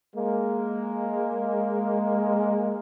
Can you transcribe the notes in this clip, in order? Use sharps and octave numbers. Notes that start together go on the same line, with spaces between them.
G#3 A#3